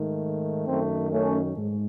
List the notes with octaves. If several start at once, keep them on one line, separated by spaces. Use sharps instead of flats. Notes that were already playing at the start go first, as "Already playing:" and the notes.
Already playing: G#2 D#3 A3
F#2 D#3 A3 C4 D#4
A3 C#4
G#2